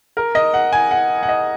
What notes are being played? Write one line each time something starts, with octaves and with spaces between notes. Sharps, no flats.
A#4
D#5
F#5
G#5
F#5
F#5
D#5